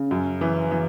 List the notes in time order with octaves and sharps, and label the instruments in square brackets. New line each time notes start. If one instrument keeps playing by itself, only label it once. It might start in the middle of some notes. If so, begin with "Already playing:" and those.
Already playing: [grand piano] C#3 [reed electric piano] C#4
[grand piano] F#2
E3
E3